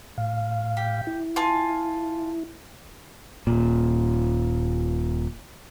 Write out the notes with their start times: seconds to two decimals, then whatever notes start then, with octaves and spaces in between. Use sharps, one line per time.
0.18 A2 F5
0.77 G4
1.07 E4
1.36 F4 G#5 A5
3.47 D#1 A#2